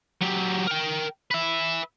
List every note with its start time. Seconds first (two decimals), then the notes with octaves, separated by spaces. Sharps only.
0.22 F#3 G4
0.67 A#4 G5
1.31 B4 E5